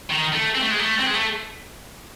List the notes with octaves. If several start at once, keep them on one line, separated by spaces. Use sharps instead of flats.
D#3
A3
C4
A3
G#3
A3
C4
G#3
A3